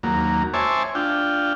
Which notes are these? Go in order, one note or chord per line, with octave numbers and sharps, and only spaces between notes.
D#2 F#3 A#3
C5 C#5 E5 G#5 A5 D6
D4 F4 G5